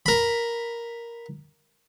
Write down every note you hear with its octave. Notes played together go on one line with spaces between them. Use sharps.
A#4 B5